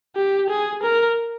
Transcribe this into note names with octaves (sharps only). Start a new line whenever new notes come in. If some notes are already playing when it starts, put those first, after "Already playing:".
G4
G#4
A#4